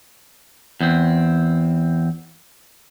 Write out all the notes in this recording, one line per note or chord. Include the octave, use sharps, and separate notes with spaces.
E2 C4